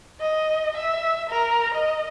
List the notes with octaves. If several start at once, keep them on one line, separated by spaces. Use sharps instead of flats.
D#5
E5
A#4
D#5